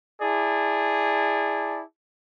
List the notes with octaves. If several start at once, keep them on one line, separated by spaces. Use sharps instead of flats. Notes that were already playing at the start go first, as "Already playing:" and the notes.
E4 G#4 D5 A5